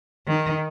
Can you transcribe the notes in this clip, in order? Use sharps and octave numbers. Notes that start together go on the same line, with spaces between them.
D#3